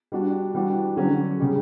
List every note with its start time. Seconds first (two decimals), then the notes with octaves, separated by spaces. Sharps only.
0.12 G3 D4 F#4
0.54 E3 G3 D4 F#4
0.96 D3 F#3 C#4 F#4
1.40 C#3 G3